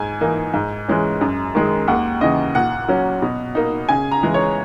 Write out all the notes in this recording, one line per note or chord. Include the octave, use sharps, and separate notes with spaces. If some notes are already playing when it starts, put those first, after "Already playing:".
Already playing: G#2 G#5
E3 A#3 D#4
G#2
E3 G#3 C#4
F#2
D#3 G#3
D#2 F#5
C#3 E3 D#5
A#2 F#5
F#3 C#4
B2
A#3 D#4
C#3 G#5
A#5
E3 G#3
C#5